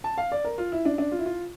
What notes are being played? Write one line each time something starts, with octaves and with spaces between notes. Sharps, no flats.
A5
F5
D5
A#4
F4
E4
D4
D4
F4
E4
F4